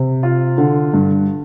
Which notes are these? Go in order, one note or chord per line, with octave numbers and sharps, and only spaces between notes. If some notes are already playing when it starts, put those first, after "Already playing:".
Already playing: C3
F4
D3
G2